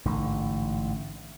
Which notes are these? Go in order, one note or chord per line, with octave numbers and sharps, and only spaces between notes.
A1 G#2 D3